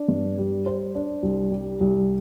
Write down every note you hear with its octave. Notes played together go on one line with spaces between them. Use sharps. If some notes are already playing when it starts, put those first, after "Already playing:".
Already playing: D4
G2
G3
C5
D4
C2
G3
C2